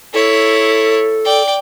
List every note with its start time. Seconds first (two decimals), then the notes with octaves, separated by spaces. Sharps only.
0.14 E4 A4 C#5
1.25 D5 G5